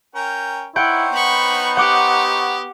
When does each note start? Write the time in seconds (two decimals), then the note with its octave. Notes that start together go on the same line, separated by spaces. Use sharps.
0.15 C#4 A#4 G5
0.76 D#4 E4 C5 C#5 F#5 G5
1.13 B3 B5 C#6
1.77 G4 F#5 D6